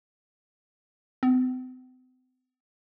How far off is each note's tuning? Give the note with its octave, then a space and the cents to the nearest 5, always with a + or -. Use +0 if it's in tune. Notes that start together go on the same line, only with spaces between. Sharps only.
C4 -45